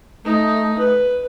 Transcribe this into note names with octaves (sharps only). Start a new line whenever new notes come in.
A3 D#4
B4